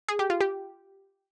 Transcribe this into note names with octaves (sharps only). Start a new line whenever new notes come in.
G#4
G4
F4
G4